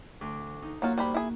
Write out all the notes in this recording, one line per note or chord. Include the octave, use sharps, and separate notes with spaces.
D2 D6
D#4
F#3 A#3 F4 F#4
G3 C5 B5
E4 G#4